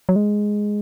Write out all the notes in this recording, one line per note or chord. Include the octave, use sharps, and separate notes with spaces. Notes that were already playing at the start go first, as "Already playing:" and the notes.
F#3
G#3